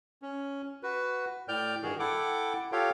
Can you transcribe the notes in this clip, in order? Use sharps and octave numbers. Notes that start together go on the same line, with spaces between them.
C#4
F#4 B4
A2 D5 G5 F6 G6
G2 D#3 F#4 G#4
E4 A4 F#5 G5 D6
F4 G4 A4 C#5 F5 G5